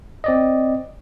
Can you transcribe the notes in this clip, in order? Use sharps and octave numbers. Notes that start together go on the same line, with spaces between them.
C4 D5 D#5